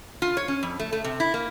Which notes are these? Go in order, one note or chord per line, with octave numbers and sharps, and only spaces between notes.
F4
C#5
C#4
F2
A3
A3
C3
E4
A#3